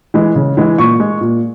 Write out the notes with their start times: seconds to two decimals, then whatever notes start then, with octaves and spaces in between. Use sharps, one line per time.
0.14 E3 G#3
0.36 C#3
0.57 E3 G#3
0.78 A#2 C#6
1.00 G#3
1.21 A#2